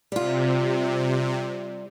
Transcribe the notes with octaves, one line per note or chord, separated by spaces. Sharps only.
C3 G3 F4